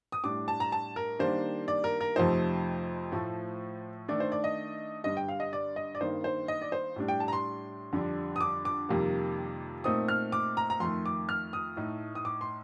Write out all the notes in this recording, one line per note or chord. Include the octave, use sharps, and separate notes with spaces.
D#6
A2 G3 D4 D6
A5
A#5
A5
A#4
D#3 G3 A#3 D4 C5
D5
A#4
A#4
F2 C3 F3 A3 D#4 C5
A2 F3 A3
D#3 A3 D4 D5
C5
D5
D#5
G2 D3 G3 D#5
G5
F5
D#5
D5
D#5
D5
G2 D#3 A#3 D#4 C5
C5
D#5
D5
C5
A2 G3 D4
G5
A5
A#5
C6
F2 D3 G3 D4
D#6
D6
D6
F2 C3 D#3 G3 A#3
A#2 A3 C4 D#4 D#6
F6
D6
A#5
A#5
F2 D#3 A3 C6
D6
F6
D#6
A2 A3 D#4
D#6
D6
C6